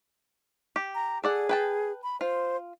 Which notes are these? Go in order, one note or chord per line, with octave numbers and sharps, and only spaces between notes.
G4
A#5
G#4 A4 D5 F#5
B4 G5 A5
B5
F4 C5